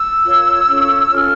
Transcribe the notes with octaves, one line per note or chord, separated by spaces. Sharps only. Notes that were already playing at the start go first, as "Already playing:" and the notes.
Already playing: E6
F4 A#4 C#5
C#4 F4 A4 C#5
C#4 F4 A4 C#5 F6